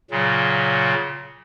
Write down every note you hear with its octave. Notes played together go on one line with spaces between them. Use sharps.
A#2 C#3 F#3